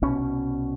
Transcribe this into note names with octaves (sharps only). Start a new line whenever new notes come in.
C2 B2 C#4